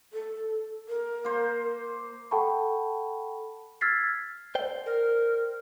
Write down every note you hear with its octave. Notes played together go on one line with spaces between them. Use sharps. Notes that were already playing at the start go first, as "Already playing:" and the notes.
A4
A#4
A#3 C5
A4 F#5 G5 A5 B5 C#6
E6 F6 G#6 A6 B6 C7
C5 D5 G5
A#4